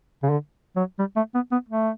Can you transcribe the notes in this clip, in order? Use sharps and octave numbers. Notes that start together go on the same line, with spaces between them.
C#3
D3
F#3
G3
A3
B3
B3
A3